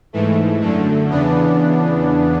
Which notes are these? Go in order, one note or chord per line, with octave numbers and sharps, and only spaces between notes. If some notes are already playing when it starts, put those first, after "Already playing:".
G#2 E3 A3
F#2 D3 A3
E2 C#3 E3 B3 D4